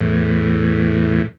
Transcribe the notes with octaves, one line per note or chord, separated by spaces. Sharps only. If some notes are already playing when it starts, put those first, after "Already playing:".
E2 A2